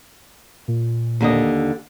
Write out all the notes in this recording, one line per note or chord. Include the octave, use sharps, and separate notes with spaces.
A#2
D#2 D3 D#5